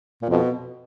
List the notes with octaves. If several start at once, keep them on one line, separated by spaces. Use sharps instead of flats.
A#2
F2 B2